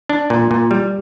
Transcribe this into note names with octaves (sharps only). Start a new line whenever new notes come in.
D4
A#2
A#2
G3